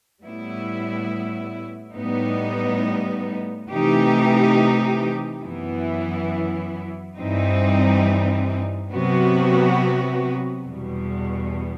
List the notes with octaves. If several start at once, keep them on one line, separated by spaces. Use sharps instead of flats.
A2 G3 B3 E4
A2 G3 B3 D#4
C3 E3 A3 D#4 G4
F#2 E3 B3 E4
G2 E3 G3 C4 D#4
C3 F#3 B3 F#4
E2 B2 G3